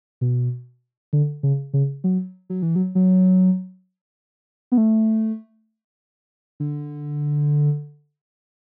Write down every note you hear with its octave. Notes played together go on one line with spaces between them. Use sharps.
B2
D3
C#3
C#3
F#3
F#3
E3
F#3
F#3
B3
A3
D3